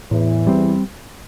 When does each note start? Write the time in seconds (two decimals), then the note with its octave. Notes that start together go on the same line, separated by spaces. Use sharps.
0.11 E2 A2 E3
0.47 G3 C4